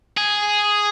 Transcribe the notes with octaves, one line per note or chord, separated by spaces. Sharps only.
G#4